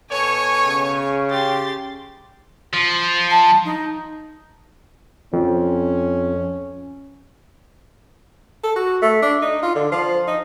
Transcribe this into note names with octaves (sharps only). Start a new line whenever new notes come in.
B2 A4 C#5 G#5 C#6
C#3
G4 C6 A6
F3
A5
D#4
F2 C#4
A4
F#4
A3
D4
D#4
F4
D3
F3
D#4